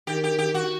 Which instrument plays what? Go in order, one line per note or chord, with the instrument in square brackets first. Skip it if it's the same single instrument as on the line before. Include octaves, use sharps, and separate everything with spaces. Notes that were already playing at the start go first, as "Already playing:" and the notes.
[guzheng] D#3 [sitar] G4
[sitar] G4
G4
F#4